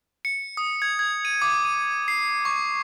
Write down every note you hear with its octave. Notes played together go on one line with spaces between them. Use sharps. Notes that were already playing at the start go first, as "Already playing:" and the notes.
C#7
D#6
G#6
G#6
D#7
D6
D#7
C7
C#6